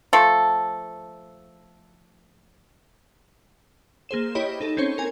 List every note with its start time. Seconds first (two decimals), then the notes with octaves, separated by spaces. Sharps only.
0.13 F3 A3 A4
4.09 A#3 G#4 C5 E7
4.35 E4 G4 C#5 D#5 B5
4.61 D#4 A4
4.77 C4 C#4 C5 C#5
4.98 A#4 G#5